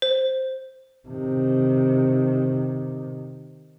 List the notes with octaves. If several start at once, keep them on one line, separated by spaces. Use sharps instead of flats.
C5
C3 D#3